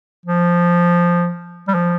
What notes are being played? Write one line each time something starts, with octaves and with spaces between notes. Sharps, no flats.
F3
G3
F3